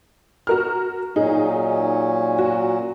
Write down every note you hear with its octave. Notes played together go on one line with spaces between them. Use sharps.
F#4 A#4 F6
A#2 F#3 C#4 D#4 G#4
F#4